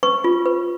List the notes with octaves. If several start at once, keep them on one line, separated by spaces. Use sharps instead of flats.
B4 C#6
F4
B4